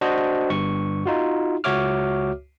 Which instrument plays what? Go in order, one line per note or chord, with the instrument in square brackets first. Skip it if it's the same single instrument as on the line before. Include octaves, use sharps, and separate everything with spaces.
[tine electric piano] D4 F#4 C5 D#5
G1 G2 C#6
D#4 F4 F#4
C#2 F#4 C#5 E5 D6 F6